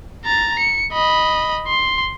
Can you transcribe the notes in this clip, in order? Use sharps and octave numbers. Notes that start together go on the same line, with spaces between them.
A#5 A6
C#7
D#5 B5
C6